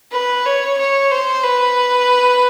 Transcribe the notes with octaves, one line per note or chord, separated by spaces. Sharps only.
B4
C#5
C#5
C5
B4